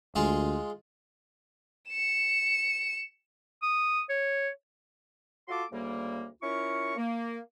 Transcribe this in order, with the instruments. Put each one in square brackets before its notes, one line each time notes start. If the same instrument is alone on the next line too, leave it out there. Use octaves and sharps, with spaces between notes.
[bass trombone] D2 [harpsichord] G#3 F4 G#4
[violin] C#7 E7
[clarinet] D#6
C#5
[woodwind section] F4 F#4 A4 A5 C6 D6
D2 C#3 G3 A#3
C#4 E4 F4 A#4 C#6
A#3